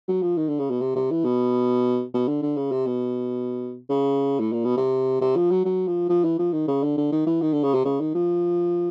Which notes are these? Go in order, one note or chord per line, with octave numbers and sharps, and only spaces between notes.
F#3
F3
D#3
D3
C#3
B2
C3
C3
E3
B2
B2
D3
D3
C#3
C3
B2
C#3
A2
A#2
B2
C3
C3
F3
F#3
F#3
F3
F3
E3
F3
D#3
C#3
D3
D3
D#3
E3
D#3
D3
C#3
C3
C#3
D#3
F3